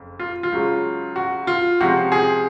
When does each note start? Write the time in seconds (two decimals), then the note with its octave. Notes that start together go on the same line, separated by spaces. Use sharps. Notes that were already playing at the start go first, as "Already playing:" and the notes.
Already playing: F#1 F2
0.20 F4
0.43 F4
0.52 C#2 C#3 F#3
1.16 F#4
1.47 F4
1.80 C#2 C3 F3 F#4
2.12 G#4